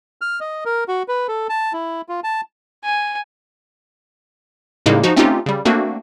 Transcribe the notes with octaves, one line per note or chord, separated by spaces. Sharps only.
F6
D#5
A#4
F#4
B4
A4
A5
E4
F4
A5
G#5
A2 C#3 G3 G#3 A#3 D#4
F3 D#4 F#4
A3 C4 C#4 D#4 F4 G4
C#3 G3
A3 A#3 C4 D4 F#4